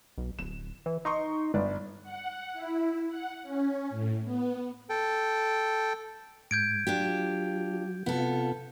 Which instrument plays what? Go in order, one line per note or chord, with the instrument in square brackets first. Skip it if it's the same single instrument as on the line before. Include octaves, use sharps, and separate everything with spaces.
[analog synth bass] B1
[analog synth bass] D1 [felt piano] E7
[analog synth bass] E3
[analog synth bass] D#4 [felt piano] D#5 C6 C#6
[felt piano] G1 D5
[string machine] F#5
E4
F#5
C#4
A2
B3
[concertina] A4 G5
[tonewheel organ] G#2 [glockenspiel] G6 G#6 D7
[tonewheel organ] F#3 [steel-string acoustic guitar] D4 F4 G4
[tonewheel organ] C3 F4 [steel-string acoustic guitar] B3 A4